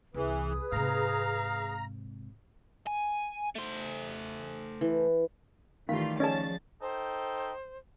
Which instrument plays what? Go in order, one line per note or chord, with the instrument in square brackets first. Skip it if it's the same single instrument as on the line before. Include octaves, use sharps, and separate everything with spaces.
[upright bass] C2 [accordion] E3 [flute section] G#4 B4 D#6
[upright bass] G#2 C3 [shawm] F5 [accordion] A#5
[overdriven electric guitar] G#5
A3 C5
[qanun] E3
[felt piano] D#3 A3 [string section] E3 G3 F4 [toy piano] F5
[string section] F3 A6 [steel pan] C#4 A5 [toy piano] G#4 D5
[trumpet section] D#4 A4 G5 [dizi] C5